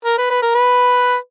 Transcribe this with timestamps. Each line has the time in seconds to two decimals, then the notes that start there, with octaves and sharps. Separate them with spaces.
0.05 A#4
0.18 B4
0.30 B4
0.42 A#4
0.55 B4